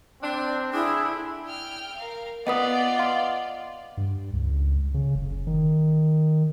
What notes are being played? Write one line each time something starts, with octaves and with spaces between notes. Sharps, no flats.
C4 D4
D3 D4 E4 G#4
G5 F6
A#4 F5
B3 F4 B4 D5 D#5 F#5 D#6
F5 C6
G2
C#2
C#3
F#1
D#3